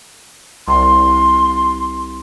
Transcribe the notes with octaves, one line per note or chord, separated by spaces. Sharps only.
C2 C6